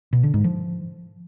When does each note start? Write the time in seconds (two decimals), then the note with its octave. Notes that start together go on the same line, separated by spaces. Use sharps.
0.13 B2
0.23 D3
0.34 G#2
0.44 F3